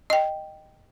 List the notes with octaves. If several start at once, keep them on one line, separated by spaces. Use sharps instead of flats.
D#5 G5